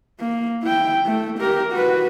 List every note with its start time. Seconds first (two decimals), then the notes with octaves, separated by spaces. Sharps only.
0.20 A#3
0.63 E4 G5
1.06 A3
1.39 G4 A#4
1.73 F#4 B4